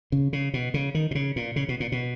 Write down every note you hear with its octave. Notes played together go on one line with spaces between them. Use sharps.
C#3
C#3
B2
C#3
D#3
B2
C#3
A#2
C#3
B2
A#2
B2